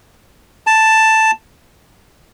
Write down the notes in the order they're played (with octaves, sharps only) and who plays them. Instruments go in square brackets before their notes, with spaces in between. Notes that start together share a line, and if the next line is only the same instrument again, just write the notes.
[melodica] A5